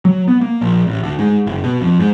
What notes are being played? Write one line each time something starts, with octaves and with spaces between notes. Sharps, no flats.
F#3
B3
A#3
A#1
A1
D2
G#2
F#1
B2
F2
G#2